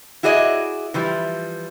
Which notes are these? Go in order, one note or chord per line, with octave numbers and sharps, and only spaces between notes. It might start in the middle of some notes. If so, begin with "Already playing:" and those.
E4 F#4 G#4 D5 D#5
E3 F3 G3